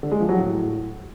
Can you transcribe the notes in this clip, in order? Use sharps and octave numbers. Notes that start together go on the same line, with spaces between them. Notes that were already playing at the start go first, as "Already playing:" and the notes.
D3
G#3
F3
F#3
A2